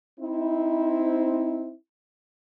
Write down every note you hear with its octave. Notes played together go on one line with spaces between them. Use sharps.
C4 D#4 E4